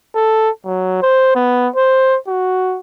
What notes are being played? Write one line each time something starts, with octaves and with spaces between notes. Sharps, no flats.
A4
F#3
C5
B3
C5
F#4